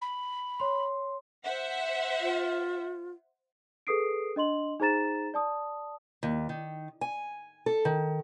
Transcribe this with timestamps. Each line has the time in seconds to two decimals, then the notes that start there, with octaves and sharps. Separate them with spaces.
0.01 B5
0.60 C#5 C6
1.43 C5 E5 F#5
2.20 F4
3.87 G#4 A4 B4 D#6 C7 D7
4.36 D4 D#5 C6 F#7
4.80 D#4 G#4 C5 A#5 A6 E7
5.34 D5 A5 D#6
6.23 D#2
6.49 D#3
7.01 G#5
7.66 A4
7.85 D#3